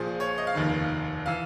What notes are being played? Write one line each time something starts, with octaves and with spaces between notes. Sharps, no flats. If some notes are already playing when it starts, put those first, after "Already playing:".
Already playing: A#1 A#2 F3 G#4
C#5
D#5
F5
F1 D#2 D#3
E3 F5